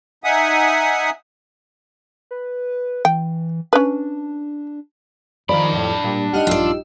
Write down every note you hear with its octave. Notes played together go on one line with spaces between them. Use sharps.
D#4 E5 F#5 G#5 D#6
B4
E3 G5
C#4 D4 B4
D#3 F3 D4 D5 B5
F2 A2
A#2 G3
D#4 G4 F#5 F6 D#7
A#1 G2 F4 D5 E6